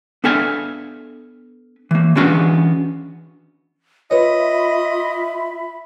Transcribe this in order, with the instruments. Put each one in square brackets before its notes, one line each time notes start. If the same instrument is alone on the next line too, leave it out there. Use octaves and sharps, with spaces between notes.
[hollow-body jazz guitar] B3 D4 A4 E5 F5 G#5
E3 A#3
E3 B3 C#4 D4 F#4 F5
[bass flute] F4 [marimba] B4 C#5 [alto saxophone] D#5 [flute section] E5 B5